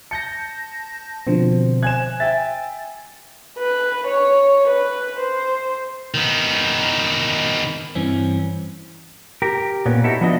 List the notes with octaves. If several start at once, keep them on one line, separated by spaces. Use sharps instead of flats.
A5 G6 A#6 C#7
B2 D3 F3 C4
C5 G#5 F#6 G#6 E7
E5 G5 G#5 A6
B4
C#5
B4
C5
D#3 B3
G2 E3 C4 C#4
G4 A#4
A#2 B3 C#4
D#4 E4 F#4 G4 A4
F3 B3 D4 F#4 D#5 E5